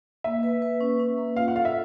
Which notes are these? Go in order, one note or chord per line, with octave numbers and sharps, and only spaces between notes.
A#3 E5
B4
B4
C#4
C#4
A#3
F4 F5
F#5
A4 F5
E5